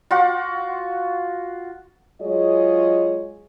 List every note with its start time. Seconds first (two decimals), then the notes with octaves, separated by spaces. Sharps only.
0.11 F4 F#4 F#5
2.22 F#3 G#3 F4 G#4 C#5 D#5